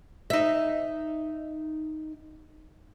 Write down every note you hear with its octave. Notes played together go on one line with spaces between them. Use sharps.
D#4 E5